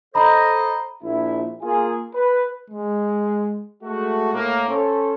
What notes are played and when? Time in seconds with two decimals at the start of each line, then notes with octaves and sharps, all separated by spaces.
0.15 A4 C5 D#5 A#5 B5
1.03 A#1 E4
1.62 A#3 F4 G#4
2.14 B4
2.70 G#3
3.83 G#3 A3 F#4
4.33 A2 A#3
4.68 C#4 A4 C5 C#5